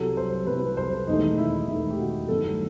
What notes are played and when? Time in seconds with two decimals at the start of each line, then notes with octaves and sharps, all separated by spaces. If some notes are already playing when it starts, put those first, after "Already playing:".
Already playing: C2 C3 F#3 A4
0.17 C5
0.47 C2 C3 F#3 B4
0.77 C5
1.07 E1 E2 D#3 A3 D#4
1.38 E4
1.68 E1 E2 D#3 A3 E4
1.90 G4
1.99 F#4
2.28 G1 G2 D#3 F#3 A3 A4